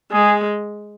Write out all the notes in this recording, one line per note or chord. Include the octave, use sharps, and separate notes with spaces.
G#3 G#4